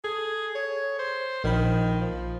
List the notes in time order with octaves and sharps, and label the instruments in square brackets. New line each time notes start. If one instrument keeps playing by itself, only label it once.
[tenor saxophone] G#4 [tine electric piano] A4
[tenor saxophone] C#5
C5
[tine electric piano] A#1 B5 [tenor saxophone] D#3
[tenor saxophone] F3